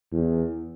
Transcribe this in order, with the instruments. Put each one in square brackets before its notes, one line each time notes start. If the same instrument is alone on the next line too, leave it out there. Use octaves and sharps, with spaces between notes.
[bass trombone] E2